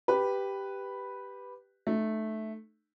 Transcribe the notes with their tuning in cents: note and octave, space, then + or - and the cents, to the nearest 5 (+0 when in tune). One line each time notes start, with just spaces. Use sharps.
G4 +0 B4 +0
A3 -10 D#4 -35